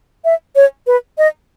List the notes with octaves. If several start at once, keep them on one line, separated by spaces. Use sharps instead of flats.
E5
C#5
B4
D#5